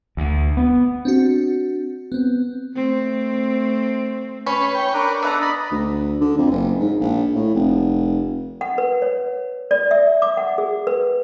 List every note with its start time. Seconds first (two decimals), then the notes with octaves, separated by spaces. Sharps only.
0.17 D2
0.57 B3
1.05 C4 D4 F#4
2.12 B3 C4
2.76 A3 C4
4.46 C#4 B4 C#6
4.75 C#5 G5
4.94 D4 A#4 B4
5.22 B3 A4 B4 F5 A#5
5.42 D5 D#5 B5
5.71 D2
6.21 D3
6.38 F2
6.51 F#1
6.80 G#2
7.00 A#1
7.35 A2
7.55 F1
8.61 F#5
8.78 B4
9.02 C#5
9.71 D5
9.91 E5
10.22 D6
10.37 F#5
10.58 G#4
10.87 B4